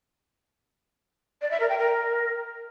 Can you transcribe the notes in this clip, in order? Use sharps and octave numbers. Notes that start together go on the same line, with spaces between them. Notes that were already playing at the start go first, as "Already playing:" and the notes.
D5
E5
A#4
G5
A#4